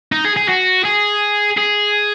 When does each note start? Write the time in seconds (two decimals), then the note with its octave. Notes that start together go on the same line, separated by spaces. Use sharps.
0.12 D#4
0.25 G#4
0.37 G#4
0.49 F#4
0.85 G#4
1.57 G#4